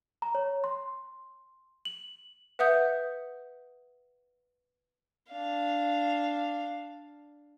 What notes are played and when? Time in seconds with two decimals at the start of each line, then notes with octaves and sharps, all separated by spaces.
0.22 A#5
0.35 C#5
0.64 C6
1.85 F#7
2.59 B4 E5 F#5 D#6 G6
5.30 D4 F5